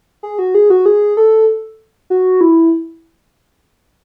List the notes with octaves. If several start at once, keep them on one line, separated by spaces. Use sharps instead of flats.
G#4
F#4
G#4
F#4
G#4
A4
F#4
E4